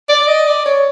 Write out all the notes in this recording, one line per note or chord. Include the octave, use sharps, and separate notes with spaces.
D5
D#5
D5
C#5